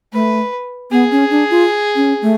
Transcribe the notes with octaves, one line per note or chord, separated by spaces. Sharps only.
A3 B4
B3 G#4
C#4
D4
F4
C#4
A3